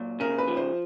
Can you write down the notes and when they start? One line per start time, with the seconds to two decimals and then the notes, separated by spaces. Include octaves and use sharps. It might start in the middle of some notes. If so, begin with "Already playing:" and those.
Already playing: A#2 F#3
0.20 C#3 A#4
0.38 B4
0.48 F3
0.57 C5